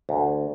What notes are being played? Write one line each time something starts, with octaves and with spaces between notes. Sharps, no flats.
D2